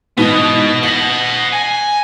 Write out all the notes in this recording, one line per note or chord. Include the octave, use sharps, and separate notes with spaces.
G#2 B2 E3 B3 D#5
D#5 F#5 B6 F#7
G#5